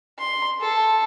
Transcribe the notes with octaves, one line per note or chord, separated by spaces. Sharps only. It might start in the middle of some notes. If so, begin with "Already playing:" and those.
C6
A4